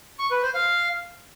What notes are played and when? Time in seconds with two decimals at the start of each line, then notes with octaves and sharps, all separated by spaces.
0.19 C#6
0.31 B4
0.43 C5
0.55 F5